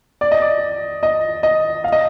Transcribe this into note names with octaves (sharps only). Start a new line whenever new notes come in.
D5
D#5
D5
D#5
D#5
F5
D#5